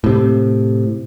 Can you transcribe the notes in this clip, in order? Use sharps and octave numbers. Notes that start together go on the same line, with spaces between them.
A2 C3